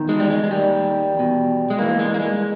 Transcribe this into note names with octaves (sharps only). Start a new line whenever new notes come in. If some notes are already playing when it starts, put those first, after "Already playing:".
Already playing: E2 D#3
G#3
G3
G#3
G#3
D#2 D#3 G3
E2 B2
G#3
G2 E3 A#3
G#3
A#3
G#3